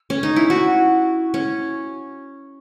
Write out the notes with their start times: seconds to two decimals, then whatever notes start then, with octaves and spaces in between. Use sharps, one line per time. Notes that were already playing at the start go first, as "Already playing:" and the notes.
Already playing: B3
0.10 C#4
0.23 D#4
0.36 E4
0.50 F#4
1.34 C#4